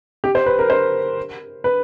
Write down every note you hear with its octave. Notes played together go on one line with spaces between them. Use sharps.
G4
C5
B4
A#4
C5
B4